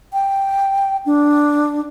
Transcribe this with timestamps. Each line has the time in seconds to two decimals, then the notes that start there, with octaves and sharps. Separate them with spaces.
0.13 G5
1.06 D4